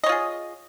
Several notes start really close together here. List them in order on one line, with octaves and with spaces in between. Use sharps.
D#5 C#5 F4 G#4